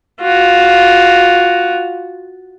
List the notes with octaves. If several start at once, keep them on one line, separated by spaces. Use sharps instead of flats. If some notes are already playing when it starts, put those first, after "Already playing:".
F4 F#4